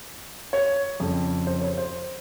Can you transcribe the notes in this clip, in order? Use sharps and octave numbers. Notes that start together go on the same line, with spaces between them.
C#5
F2 C#3
C5
C#5
C5